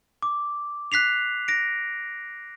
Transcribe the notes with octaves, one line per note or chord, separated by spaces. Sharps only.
D6
F#6 B6 C7 F7
A#6 D7